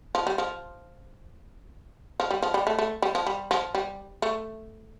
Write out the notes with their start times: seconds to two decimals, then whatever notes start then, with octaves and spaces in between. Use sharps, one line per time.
0.15 F3
0.27 G3
0.38 F3
2.20 F3
2.31 G3
2.42 F3
2.54 G3
2.67 A3
2.79 A3
3.02 G3
3.15 F3
3.27 G3
3.51 F3
3.75 G3
4.22 A3